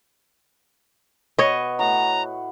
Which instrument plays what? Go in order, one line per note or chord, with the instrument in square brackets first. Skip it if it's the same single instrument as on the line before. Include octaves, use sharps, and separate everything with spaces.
[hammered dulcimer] B2 B4 [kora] C#5 D#5
[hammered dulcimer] A2 F#4 F#5 [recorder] A#5